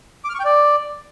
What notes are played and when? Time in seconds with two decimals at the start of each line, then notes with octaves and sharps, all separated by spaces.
0.24 D6
0.29 F6
0.35 C#6
0.40 G5
0.45 D5